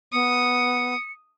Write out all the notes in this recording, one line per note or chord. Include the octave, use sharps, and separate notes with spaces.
B3 D#6 C#7